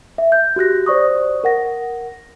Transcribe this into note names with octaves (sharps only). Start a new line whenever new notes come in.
E5
G6
F#4 G4 F#6 A#6
C5 D5 C#6 D#6
A#4 F#5 A#6